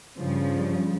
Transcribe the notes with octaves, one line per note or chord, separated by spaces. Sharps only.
G2 C#3 F3